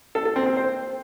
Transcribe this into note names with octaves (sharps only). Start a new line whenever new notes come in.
A4
A4
C4
C4
C5